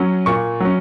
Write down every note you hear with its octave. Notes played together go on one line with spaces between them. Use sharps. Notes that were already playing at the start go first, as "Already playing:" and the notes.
Already playing: F#3 C#4
A#2 C#6
F#3 C#4